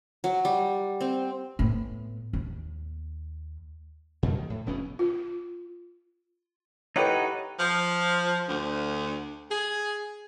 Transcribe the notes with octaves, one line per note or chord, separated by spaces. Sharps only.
F#3
G3
C4
A2 B3
D#2
F2 B2 E3 A3
D#3
A2
F1 D#2 B3 C#4
F4
D#4 E4 G4 A4 B4 C#5 D#5 F#5
F3
D2
G#4